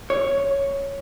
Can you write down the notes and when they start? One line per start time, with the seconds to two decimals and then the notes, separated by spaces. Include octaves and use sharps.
0.10 C#5